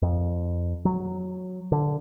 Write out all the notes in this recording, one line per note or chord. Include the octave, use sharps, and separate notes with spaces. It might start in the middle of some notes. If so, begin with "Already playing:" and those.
F2
F#3
D3